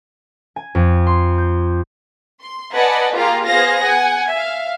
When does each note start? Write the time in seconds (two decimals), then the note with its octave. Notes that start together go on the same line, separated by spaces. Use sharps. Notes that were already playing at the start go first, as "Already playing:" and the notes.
0.56 G#5
0.75 F2
1.07 C6
1.38 G6
2.41 C6
2.74 B4 D5 D#5 F#5 G#5 A5
3.14 A#3 F4 G4 G#4 F5 A#5
3.46 B3 G#4 C5 F5 A#6
3.83 F#5 G#5
4.32 E5 F5